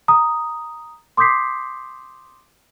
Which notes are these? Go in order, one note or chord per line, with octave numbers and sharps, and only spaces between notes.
A#5 D#6
C6 D6 D#6 G6 B6 C7